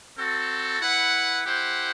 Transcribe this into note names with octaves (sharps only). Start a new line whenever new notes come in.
C4 F#4 A4
E4 B4 F#5
E4 G4 C5 F#5